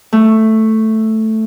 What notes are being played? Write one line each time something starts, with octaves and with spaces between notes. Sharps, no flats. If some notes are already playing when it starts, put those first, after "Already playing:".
A3